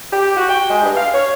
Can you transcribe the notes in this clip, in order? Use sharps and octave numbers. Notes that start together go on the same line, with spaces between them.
G4
F#4
G5
G#3
G2
F5
C#5